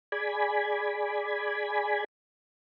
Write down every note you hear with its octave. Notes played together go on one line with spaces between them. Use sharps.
G#4 D5 G#5 B5